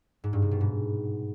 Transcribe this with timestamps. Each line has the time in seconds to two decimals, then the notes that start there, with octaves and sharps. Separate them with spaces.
0.24 G#2
0.33 G2
0.42 C3
0.51 B2
0.61 G#2